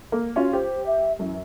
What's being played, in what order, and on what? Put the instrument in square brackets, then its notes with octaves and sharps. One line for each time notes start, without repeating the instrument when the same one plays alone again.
[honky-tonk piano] A#3
[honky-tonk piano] C#4 F4 [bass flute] F#4
[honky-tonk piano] G4 [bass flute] C5
[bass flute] E5
[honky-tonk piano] F#2 [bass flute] E3